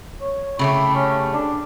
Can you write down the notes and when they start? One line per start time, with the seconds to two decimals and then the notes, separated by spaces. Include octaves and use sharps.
0.21 C#5
0.59 C#3 A3 E4 G4
0.95 C#4
1.33 D4